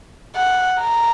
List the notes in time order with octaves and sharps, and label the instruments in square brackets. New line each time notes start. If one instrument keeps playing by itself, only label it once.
[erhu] F#5
A#5